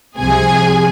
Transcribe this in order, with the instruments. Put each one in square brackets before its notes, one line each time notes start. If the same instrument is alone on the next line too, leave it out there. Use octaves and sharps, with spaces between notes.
[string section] C2 C3 F3 G#4 G#5